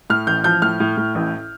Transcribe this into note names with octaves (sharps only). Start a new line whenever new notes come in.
A2 F6
A1 G6
F3 G6
A2 F6
A2
A2
A1